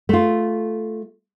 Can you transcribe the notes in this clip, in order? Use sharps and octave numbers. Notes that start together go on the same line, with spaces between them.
A3 F4